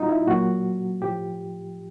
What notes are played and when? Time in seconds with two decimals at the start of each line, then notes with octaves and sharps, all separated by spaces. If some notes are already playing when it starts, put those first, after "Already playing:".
Already playing: A#2 G3 D#4 F4 F#4
0.09 E4
0.27 A#2 F#3 F#4
1.02 A2 F3 G4